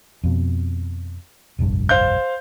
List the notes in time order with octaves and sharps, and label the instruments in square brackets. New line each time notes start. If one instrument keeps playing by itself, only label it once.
[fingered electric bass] F2 B2
F1 A#1 G2
[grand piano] C5 F5 G6